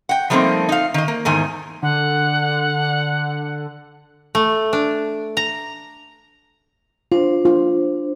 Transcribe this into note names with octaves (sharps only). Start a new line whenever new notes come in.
F#5 G5
F3 G3 A3 A#3 C4 D#4
D#4 F5
D#3 D#5
A#3
E2 G#2 D#3 G#5
D3 F#5
A3
D4
A#5
D4 F4 C5
F4